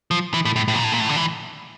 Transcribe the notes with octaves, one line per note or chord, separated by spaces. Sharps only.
F3
E3
A2
A2
A2
A#2
A2
A#2
A2
D3
E3